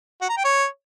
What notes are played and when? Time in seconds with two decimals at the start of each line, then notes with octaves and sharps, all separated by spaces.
0.22 F#4
0.29 A#5
0.37 G5
0.44 C#5